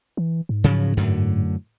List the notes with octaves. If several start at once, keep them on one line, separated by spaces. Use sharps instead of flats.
E3
G#2
C#3 F3 F#3
F#2 A2 D3